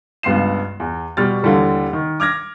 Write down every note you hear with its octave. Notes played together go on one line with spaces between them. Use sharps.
C#2 G2 B3 C6 C7 E7
E2
B2 G3 F6 A6
D#2 D3 E3 G3 A4
D#3
D6 F6 G#6 A#6